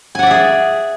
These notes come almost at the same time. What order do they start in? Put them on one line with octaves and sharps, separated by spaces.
G#5 F#5 D5 E5 G#4